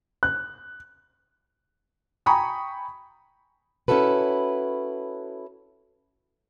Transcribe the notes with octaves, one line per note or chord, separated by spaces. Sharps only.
F#6
G5 G#5 A#5 B5 C#6 D#6
C#4 E4 F#4 A4 B4